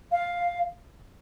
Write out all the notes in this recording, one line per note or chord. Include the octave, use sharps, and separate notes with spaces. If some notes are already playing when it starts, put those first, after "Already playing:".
F5